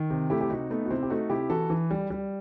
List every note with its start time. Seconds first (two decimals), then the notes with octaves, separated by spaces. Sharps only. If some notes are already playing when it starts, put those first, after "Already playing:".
Already playing: D#3
0.10 C3
0.30 A3 E4 G4
0.41 G4
0.50 C3 D#4 F#4
0.70 A3 B3 D#4
0.86 F#4
0.90 C3 C4 E4
1.03 G4
1.10 A3 D#4 F#4
1.30 C3 E4 G4
1.50 E3 F#4 A4
1.70 E3
1.91 G3
2.10 G3